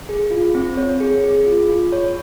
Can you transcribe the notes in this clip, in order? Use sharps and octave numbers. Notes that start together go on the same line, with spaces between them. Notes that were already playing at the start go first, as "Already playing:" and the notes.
G#4
F4
C4
C#5
G#4
G#4
F4
F4
C#5